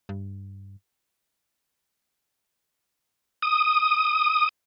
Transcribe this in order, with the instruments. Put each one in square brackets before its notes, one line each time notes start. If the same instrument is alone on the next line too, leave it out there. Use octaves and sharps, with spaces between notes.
[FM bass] G2
[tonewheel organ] D#6